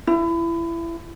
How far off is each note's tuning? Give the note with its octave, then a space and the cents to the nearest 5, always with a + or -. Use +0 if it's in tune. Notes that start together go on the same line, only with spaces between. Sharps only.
E4 +25